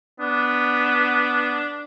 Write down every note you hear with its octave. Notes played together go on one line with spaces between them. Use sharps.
B3 D4